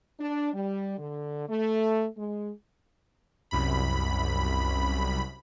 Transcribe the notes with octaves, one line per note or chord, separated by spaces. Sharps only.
D4
G3
D3
A3
G#3
C2 F#2 B5